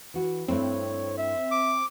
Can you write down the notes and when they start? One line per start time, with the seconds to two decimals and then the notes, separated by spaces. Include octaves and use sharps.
0.14 E3 F#4
0.48 G2 A3 C4 E4 C#5
1.18 E5
1.51 D6